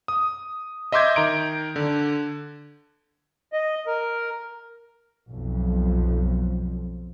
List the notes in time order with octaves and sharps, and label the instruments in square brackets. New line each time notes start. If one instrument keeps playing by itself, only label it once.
[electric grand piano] D#6
D#5 E5 C6 D6 G6 G#6
D#3 A#5 D7
D3
[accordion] D#5
A#4
[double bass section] B1 F2